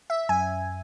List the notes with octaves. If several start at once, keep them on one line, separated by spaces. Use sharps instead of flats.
E5
F#2 G#5